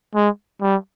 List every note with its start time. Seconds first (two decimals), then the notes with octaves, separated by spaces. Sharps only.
0.15 G#3
0.61 G3